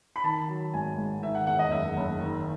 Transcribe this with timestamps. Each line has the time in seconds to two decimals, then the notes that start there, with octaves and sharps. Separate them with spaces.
0.16 B5
0.24 D#3 A5
0.48 F#3
0.74 G#1 G#5
0.98 G#2
1.23 D#3 E5
1.35 F#5
1.47 E2 F#5
1.59 D#5
1.71 F#1 E5
1.96 F#1
2.21 D#3